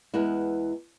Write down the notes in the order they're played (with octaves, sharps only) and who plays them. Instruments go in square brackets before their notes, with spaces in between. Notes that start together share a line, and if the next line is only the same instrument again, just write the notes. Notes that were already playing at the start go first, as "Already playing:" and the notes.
[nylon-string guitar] E2 G#3 B3 E4